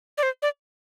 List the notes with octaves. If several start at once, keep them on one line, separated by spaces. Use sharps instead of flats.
D5
C5
D5